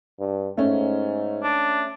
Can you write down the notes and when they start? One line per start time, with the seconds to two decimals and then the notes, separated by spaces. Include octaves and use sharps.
0.20 G2
0.57 G#2 A3 C#4
1.44 D4